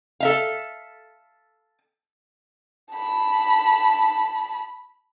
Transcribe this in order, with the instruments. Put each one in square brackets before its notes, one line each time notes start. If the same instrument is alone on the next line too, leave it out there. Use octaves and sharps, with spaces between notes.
[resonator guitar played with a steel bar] A4 E5 F5
[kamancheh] A5 B5